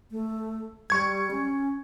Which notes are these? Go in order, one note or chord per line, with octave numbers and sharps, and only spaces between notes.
A3
G3 C#6 G#6
C#4